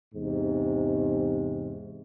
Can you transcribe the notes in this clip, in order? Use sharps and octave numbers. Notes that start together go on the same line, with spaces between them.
E2 G#2 C3